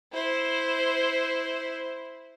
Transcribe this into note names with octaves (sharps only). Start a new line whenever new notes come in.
E4 C5